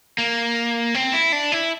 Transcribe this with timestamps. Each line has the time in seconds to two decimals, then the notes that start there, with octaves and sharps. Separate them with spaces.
0.18 A#3
0.95 C4
1.13 E4
1.32 D4
1.52 E4